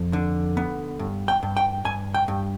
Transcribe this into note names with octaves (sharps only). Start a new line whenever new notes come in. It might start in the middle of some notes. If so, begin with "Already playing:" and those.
Already playing: F2
D3
B3
G2
G5
G2
G5
G2 G#5
G5
G2